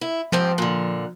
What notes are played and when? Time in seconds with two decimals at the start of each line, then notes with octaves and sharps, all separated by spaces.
0.01 E4
0.32 G#2 F3 C4 G4
0.58 A#2 D3